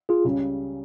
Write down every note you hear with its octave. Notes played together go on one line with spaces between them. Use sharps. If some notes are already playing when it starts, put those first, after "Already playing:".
F4 G#4
C#2 C#3 G3 C#4